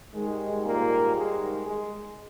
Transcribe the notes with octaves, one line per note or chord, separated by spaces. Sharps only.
G#2 D#3 G3 G#3
A#2 A#3
G#3
G#3